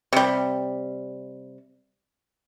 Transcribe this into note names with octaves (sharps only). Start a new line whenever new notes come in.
C3 G3